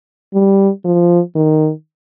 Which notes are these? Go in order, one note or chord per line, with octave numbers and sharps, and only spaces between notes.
G3
F3
D#3